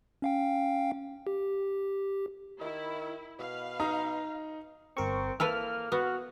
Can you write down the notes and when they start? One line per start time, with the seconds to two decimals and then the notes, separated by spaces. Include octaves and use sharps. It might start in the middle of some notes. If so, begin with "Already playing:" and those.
0.22 C#4 F5 G5
1.27 G4
2.61 D#3 E4
3.39 B2 B4 F5
3.80 D#4 A#5 D#6
4.97 G1 C4 A#4 C#6
5.40 A#3 E4 A4 B4 F6
5.92 B3 F#4